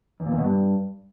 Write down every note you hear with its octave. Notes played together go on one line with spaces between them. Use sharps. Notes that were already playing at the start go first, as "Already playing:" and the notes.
E2
A#2
E2
B2
G2